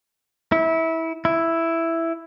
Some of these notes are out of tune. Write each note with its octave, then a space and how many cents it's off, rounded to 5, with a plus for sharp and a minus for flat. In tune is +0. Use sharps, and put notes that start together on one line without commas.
E4 -20
E4 +5